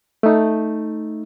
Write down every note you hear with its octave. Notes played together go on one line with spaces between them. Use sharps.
A3 D#4